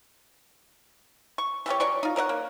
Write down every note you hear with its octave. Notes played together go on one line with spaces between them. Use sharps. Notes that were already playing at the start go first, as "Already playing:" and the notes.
C#6
E3 G3 G4 C#5
F#3 C#5 D5 C#6
D#4 F4
A#4 C#5 D#5 F#5
A#3